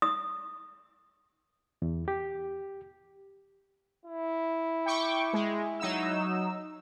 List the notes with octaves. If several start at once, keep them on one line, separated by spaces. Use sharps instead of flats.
D#6
E2
G4
E4
G5 C#6 D6
G#3
F#3 D#4 E6